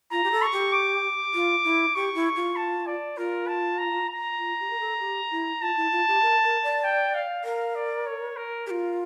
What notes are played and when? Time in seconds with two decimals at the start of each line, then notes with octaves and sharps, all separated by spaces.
0.12 F4 A#5
0.24 G4
0.32 A4
0.42 C#6
0.53 G4
0.72 D6
1.34 F4
1.64 E4
1.95 G4 C#6
2.15 E4
2.36 F4
2.56 A5
2.86 D5
3.17 F4 A#4
3.47 A5
3.78 A#5
4.09 A#5
4.39 F4
4.60 G4
4.70 A#4
4.80 A4
5.00 G4
5.31 E4
5.61 F4 A5
5.76 E4
5.92 F4
6.08 G4
6.22 A#4
6.43 A#4
6.63 D5
6.84 G5
7.14 F5
7.44 A#4 F5
7.75 D5
8.06 C#5
8.36 A#4
8.67 F4 G4 A#4